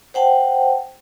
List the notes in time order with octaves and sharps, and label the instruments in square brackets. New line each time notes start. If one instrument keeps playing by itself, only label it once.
[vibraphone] C5 F#5 G5 A5